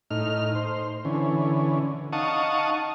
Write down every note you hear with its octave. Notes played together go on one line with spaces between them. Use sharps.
A2 D#4 F6
C5
D3 E3 C#4
D#4 F5 F#5 A5 C#6 D#6